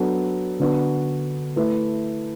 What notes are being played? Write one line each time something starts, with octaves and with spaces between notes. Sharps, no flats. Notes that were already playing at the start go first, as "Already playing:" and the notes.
Already playing: F#3 B3 D4 A4
D3 B3 D4 F#4 B4
A3 E4 B4